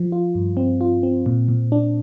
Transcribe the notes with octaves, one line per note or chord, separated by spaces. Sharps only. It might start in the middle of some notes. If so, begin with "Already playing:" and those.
Already playing: F3
F4
G2
C4
F4
C4
A#2
A#2
D4